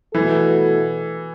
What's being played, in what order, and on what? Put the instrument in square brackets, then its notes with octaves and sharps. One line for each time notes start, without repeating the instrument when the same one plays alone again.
[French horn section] B2 A3 E4 A4 [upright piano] E3